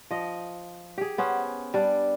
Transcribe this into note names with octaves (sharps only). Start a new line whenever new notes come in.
F3 D#5
G4 G#4
B3 C#4 C5
G3 D4